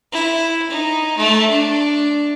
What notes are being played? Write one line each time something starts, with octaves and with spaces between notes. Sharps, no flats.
E4
D#4
A3
D4